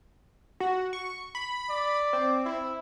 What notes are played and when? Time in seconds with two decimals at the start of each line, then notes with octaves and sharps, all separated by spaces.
0.60 F#4
0.93 C#6
1.35 B5
1.69 D5
2.13 C4
2.45 E4